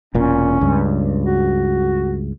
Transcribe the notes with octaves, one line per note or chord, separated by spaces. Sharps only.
E1 A#2 C#4
C#2 G2
F#4